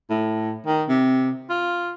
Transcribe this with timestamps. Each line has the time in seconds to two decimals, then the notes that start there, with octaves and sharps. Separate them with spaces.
0.10 A2
0.66 D#3
0.89 C3
1.50 F4